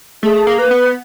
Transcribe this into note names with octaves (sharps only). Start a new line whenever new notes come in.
A3 G#4
A#3
B4
B3